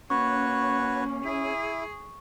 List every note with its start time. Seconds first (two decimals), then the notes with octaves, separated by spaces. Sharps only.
0.10 A#3 C#4 F#4 B4 C#5 C#6
1.25 E4 G#4